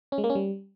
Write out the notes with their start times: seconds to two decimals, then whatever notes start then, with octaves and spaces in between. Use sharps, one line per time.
0.12 C#4
0.18 G#3
0.24 A#3
0.30 C#4
0.35 G3